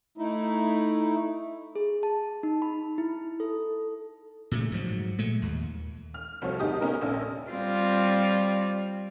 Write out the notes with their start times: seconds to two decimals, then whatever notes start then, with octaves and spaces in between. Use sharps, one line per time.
0.18 A3 D#4 E4
1.76 G#4
2.03 A5
2.43 D#4
2.62 B5
2.98 E4
3.40 A4
4.51 A#2 C#3 A3
4.72 G#2 F3 F#3
5.18 A#2 G#3 A3
5.42 D#2
6.14 F6
6.42 C2 F3 F#4 A4 C#5
6.59 D#2 D3 D#4 G4 D#6
6.81 B3 C#4 D#4 A#4
7.01 A#1 C#4 A4
7.51 G3 C4 F4